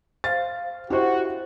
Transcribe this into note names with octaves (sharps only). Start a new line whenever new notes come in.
C5 F5 A6
E4 F#4 G4 C5